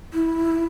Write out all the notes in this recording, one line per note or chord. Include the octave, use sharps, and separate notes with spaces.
E4